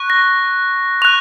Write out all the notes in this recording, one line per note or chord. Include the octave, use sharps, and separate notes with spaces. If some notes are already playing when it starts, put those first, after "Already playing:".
Already playing: C#6 F#6
A#6
C#6 F#6 F7